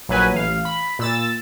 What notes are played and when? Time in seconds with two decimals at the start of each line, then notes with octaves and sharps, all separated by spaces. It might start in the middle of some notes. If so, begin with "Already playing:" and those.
0.09 A#1 F#3 B4 G#5
0.33 A1 F5
0.65 B5
0.99 A#2 E6 A6